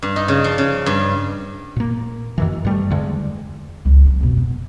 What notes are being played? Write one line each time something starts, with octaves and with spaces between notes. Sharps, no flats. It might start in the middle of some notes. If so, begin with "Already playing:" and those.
G2
D#4
C#3
F3
C#3
G2
A#2 A#3
F#2 D#3 E3
G2 G3 A3
E2 D3 G#3
C#2 F#3
D4
F2 B2
B3